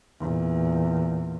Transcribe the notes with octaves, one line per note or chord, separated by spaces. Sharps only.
E2 A#2